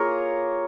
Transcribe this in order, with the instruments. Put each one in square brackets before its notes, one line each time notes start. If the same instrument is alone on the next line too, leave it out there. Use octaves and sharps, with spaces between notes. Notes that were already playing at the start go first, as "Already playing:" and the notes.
Already playing: [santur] A#3 F4 G#4 A#4 C#5